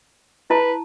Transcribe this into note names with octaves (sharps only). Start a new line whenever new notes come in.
E4 B4 A5 A#5